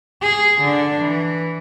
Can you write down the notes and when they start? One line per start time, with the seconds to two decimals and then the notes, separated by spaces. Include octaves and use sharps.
0.22 G#4
0.61 D3 D4
1.01 E3